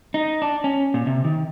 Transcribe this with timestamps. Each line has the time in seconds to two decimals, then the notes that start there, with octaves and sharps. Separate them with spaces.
0.14 D#4
0.42 D4
0.64 C#4
0.94 A#2
1.07 C3
1.25 D#3